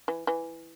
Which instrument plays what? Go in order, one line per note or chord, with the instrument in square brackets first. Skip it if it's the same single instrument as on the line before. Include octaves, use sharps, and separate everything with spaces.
[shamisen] E3
E3